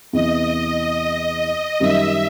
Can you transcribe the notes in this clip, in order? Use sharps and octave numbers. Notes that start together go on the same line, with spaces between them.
E2 C3 E3 D#5
F#2 D#3 G3 E5